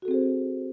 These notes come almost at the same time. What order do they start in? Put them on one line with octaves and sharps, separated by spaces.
F#4 A4 C4 G#4 C5